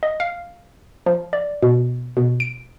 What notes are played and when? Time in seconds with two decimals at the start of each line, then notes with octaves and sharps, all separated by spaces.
0.03 D#5
0.20 F5
1.06 F3
1.33 D5
1.62 B2
2.17 B2
2.40 D7